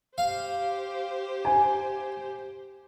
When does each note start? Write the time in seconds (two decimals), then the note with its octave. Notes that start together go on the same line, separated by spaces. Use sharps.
0.18 G4 C5 F5
1.45 G#5